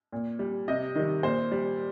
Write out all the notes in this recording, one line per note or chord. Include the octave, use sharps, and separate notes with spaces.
A#2
G3
C3 D#5
D#3 G3
A#2 C5
G3